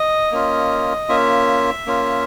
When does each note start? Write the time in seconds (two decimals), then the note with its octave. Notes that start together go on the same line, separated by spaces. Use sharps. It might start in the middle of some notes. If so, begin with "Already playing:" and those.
Already playing: D#5
0.31 A#3 C#4 F4
1.09 A#3 C#4 F4 E5
1.86 A#3 C#4 F4